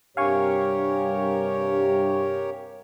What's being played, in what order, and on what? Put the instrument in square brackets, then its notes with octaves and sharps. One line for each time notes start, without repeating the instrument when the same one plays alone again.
[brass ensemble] G2 C3 [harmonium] G4 A#4 C#5 [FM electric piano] F5 G#5 C#6